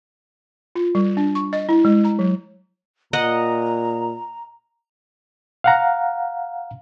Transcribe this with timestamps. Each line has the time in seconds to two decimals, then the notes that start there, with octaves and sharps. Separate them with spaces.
0.75 F4
0.95 G3
1.17 D4
1.35 C#6
1.53 D#5
1.69 E4
1.85 G#3
2.05 A#5
2.19 F#3
3.13 A#2 D#5 F#5 A#5
5.64 F5 F#5 A#5